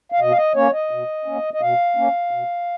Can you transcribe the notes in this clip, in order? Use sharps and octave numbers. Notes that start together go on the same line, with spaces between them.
F5
B2 D#5
F5
D#5
A#3 C#4 C#5
D#5
B2
A#3 C#4
D#5
B2 F5
A#3 C#4
B2